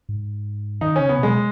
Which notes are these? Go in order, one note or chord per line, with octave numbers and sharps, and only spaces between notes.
G#2
D#3 D#4
C#3 C#4
B3
B2 G#3